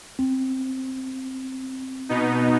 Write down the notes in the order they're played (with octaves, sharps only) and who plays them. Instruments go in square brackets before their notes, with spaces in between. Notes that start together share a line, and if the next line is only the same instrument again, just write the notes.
[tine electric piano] C4
[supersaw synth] B2 B3 D#4